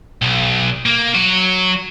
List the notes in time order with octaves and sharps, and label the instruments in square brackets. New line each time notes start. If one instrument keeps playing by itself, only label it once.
[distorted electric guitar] B1
A#3
F#3 F#4